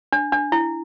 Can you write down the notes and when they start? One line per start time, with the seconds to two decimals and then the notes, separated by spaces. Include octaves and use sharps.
0.12 D4
0.32 D4
0.52 E4